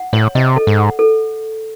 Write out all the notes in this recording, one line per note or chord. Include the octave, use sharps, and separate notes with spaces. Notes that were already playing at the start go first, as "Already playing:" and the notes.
Already playing: F#5
A2 C#5
C3 D#5
A4
G#2
F#5
A4